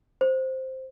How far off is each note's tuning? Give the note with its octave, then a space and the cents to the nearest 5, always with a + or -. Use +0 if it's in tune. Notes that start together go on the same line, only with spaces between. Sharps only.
C5 +0